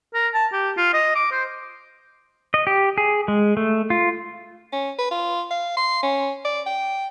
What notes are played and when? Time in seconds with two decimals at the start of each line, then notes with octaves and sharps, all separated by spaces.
0.14 A#4
0.34 A5
0.53 G4
0.77 F4
0.94 D#5
1.15 D6
1.32 C5
2.54 D#5
2.67 G4
2.98 G#4
3.28 G#3
3.57 A3
3.90 F4
4.72 C#4
4.99 B4
5.11 F4
5.51 F5
5.77 C6
6.03 C#4
6.45 D5
6.66 G5